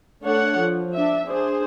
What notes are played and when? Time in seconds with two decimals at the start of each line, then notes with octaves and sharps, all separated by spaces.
0.22 A3 D4 A4 C#5 F#5
0.59 F3
0.95 D4 E5
1.27 D4 G#4 C5